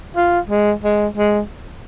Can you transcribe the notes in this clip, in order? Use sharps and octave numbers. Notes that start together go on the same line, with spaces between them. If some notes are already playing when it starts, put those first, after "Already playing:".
F4
G#3
G#3
G#3